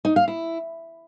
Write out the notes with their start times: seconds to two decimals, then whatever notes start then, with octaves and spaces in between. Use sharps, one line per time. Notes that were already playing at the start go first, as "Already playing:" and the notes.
0.05 D#4
0.16 F5
0.28 E4